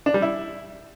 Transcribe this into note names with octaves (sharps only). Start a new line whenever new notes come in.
D4
G3
E4